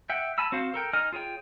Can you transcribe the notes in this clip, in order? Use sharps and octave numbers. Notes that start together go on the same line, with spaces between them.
E5 F#5 G5
G#5 A5 B5 E6
C4 F#4 C5 F5
A4 A#4 G5
D#4 D#5 G#5 F6
F4 G#4 C#5 G5